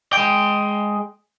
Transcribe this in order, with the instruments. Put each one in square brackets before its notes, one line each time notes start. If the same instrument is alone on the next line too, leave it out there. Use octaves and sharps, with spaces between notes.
[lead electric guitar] G#3 G5